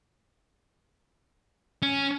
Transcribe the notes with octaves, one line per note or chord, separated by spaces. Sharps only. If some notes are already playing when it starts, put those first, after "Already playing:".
C#4